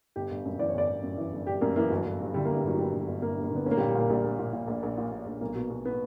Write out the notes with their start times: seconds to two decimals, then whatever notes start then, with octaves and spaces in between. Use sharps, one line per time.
0.16 G1 G4
0.30 G1
0.45 F#2
0.59 E3 D5
0.69 C#5
0.74 G1 D5
0.89 G1
1.03 F#2
1.18 E3
1.33 G1
1.47 G1 G4
1.61 F#2 A#3
1.76 E3 A#3
1.90 G1 F#3
2.06 G1
2.20 G2
2.34 D3 G3
2.45 A#3
2.49 G1
2.56 G3
2.64 G1 F#3
2.74 F#3
2.78 G2 G3
2.93 D3
3.00 F#3
3.08 G1
3.22 G1 A#3
3.37 G2
3.44 A#3
3.51 D3 B3
3.66 A#1 C#4
3.71 A#3
3.77 G3
3.80 A#2
3.88 G3
3.95 A#2 A#3
4.10 A#1 G3
4.24 A#1
4.39 A#2
4.53 A#2
4.68 A#1
4.83 A#1
4.98 A#2
5.12 A#2
5.26 A#1
5.41 B1 A#3
5.55 B2
5.70 B2
5.85 B3